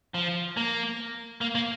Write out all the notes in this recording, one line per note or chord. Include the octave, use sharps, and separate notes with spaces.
F3
A#3
A#3
A#3